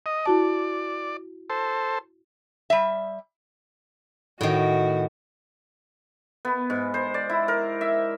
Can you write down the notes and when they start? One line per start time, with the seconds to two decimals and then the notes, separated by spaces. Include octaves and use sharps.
0.06 D#5
0.26 E4 F#4 D5 A5
1.50 A4 C5
2.70 G3 E5
4.41 A2 D#3 F#4
6.45 B3
6.70 G#2
6.94 C5
7.14 D5
7.29 E4
7.48 A#4
7.81 E5